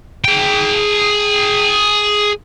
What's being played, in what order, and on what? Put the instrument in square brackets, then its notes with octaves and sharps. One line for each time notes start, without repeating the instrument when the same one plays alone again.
[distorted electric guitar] G#4 G5